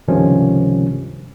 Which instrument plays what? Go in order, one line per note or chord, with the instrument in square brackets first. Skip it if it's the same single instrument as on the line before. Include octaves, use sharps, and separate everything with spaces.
[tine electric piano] C#2 G2 C3 D#3 F3 C#4